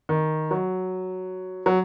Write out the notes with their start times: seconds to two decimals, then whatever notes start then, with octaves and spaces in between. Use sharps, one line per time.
0.09 D#3
0.51 F#3
1.66 F#3